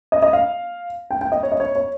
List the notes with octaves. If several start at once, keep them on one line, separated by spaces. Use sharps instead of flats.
D#5
D#5
F5
G5
G5
D#5
C#5
D#5
C#5
C#5